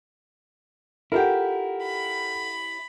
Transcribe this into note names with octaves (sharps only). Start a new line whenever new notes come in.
E4 F4 G4 A4 A#4 E5 F#5 G5
B5